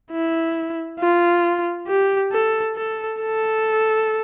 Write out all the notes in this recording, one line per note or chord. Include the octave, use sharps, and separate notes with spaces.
E4
F4
G4
A4
A4
A4